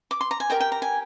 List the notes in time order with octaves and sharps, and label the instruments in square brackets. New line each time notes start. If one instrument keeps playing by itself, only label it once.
[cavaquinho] D6
C6
A#5
G#5
G4 A#4 D#5 G5
G5
A#5
G#5